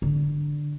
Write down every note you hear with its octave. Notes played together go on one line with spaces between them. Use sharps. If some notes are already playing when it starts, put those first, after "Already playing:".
D3